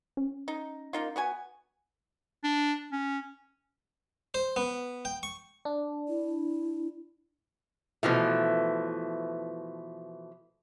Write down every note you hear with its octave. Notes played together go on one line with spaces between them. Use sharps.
C#4
D#4
A#3 D#4 F4
B3 F#4 G#5
D4
C#4
C5
B3
G5
C#6
D4
E4
B2 E3 F3 A3